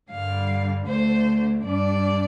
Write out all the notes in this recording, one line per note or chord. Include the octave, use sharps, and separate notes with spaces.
G2 D3 G3 F5
D2 D3 A3 C5
G2 G3 D4 D5